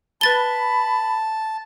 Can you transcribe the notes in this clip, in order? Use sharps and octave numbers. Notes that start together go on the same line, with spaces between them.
B4 A5 B5 A6 G7